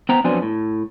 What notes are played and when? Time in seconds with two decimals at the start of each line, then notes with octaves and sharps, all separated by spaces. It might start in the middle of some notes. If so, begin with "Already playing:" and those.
0.09 B3 C5 G5 A#5
0.24 F2 F#3 B3 D4 C5 G#5
0.42 A2